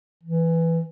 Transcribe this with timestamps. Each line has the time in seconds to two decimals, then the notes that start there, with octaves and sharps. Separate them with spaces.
0.23 E3